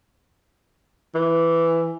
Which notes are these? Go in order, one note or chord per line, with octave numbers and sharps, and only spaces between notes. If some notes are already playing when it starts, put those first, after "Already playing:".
E3